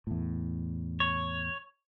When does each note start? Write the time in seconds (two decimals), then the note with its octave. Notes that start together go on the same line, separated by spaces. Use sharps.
0.07 E2 A2
1.00 C#5